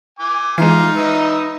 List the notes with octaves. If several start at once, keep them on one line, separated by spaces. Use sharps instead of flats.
G#5 D6
E3 G#3 D#4 F4
B4 D#5 E5